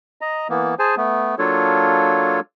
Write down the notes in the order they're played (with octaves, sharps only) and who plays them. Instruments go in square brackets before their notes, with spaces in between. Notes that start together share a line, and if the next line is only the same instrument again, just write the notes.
[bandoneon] D#5 A#5
E3 A#3 B3
G#4 C5 G#5 A5
A3 B3
F#3 A#3 D4 F4 A4 C#5